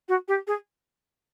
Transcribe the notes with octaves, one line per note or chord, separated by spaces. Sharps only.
F#4
G4
G#4